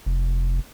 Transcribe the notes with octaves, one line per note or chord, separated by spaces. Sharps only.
F1